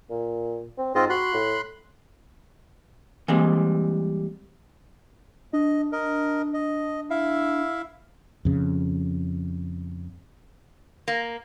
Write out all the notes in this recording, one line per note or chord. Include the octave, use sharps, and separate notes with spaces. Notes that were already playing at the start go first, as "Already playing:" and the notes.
A#2
C4
G#2 C4 F4 D#5
F#4 B5 C6 F#6
A2
E3 G3 G#3 A#3 C4
D4 D#5
A#4 D#5
D#5
E4 E5 F5
F2 C#3
A#3